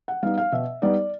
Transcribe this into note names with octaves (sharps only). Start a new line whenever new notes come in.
F#5
G3 B3 D#4 F5
F5
B2 E5
G3 B3 D#4 D5